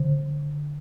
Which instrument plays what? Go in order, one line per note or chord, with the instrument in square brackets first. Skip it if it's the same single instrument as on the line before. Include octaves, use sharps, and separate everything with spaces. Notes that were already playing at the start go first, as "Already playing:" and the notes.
Already playing: [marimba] D3